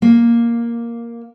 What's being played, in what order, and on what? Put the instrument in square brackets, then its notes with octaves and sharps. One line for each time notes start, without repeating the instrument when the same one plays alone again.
[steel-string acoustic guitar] A#3